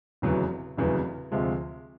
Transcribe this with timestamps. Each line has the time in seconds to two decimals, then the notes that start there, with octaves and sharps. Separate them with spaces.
0.22 F1 E2 C#3 F#3 B3
0.77 F1 E2 C#3 F#3 B3
1.32 D2 C3 F3 G#3